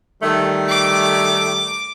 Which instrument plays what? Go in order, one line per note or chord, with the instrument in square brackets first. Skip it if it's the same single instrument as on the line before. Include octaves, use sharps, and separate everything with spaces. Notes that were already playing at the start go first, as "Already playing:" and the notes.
[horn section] D#3 G3 A3
[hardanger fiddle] D6